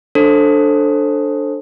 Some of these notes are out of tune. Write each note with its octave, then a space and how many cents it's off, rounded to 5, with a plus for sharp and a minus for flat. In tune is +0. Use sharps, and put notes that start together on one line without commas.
D4 +5 A4 +10 C5 +25